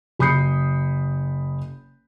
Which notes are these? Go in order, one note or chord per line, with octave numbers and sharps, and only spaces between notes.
F#1 B5 D#6 G6 C7 C#7